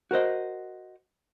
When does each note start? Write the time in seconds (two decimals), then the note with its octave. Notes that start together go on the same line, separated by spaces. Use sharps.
0.11 F#4 A#4 C5 D#5